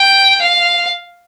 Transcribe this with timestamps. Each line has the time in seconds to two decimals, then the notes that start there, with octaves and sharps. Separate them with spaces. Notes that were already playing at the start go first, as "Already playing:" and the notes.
Already playing: G5
0.41 F5